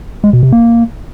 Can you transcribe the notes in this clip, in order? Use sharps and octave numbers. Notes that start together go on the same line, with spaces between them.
G#3
B2
C3
A#3